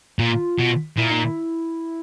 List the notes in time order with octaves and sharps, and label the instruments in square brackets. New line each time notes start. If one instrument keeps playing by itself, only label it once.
[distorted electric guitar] A#2 [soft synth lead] F4
[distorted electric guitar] B2
[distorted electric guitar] A#2 [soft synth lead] E4
[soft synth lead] D#4
E4